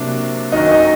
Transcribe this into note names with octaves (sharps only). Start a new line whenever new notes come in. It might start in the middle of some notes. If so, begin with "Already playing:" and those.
Already playing: C3 F#3 A#3 D4
F#2 D#3 F#3 D#4 D#5
D#4 D#5